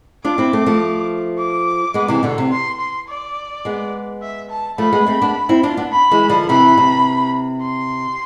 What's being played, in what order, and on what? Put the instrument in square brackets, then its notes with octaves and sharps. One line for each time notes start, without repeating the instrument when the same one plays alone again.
[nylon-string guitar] D4 F4 [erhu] D6
[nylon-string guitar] C4 E4
A3 C4
F3 A3
[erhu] D6
[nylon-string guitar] G#3 B3
C3 E3
B2 D3
C3
[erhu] C6
C6
D5
[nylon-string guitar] G#3 B3
[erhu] E5
A5
[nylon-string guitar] F3 A3 [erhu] B5
[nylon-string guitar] G#3 B3
A3 C4
B3 D4
C4 E4
D4 F4
B3 D4
[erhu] B5
[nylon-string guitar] E3 G#3
D3 F3
[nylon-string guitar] C3 E3 [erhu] B5
[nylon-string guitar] C3
[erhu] C6